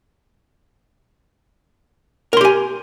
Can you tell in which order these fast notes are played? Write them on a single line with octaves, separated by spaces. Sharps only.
A#4 C6 G4 G#5